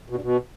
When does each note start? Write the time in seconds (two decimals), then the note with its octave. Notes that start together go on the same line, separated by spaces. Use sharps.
0.10 B2
0.16 G2
0.22 B2